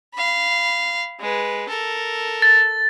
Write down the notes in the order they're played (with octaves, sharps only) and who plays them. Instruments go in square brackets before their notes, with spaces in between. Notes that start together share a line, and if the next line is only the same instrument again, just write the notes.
[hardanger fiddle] F5 B5
G#3 B4
A4 A#4
[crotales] A6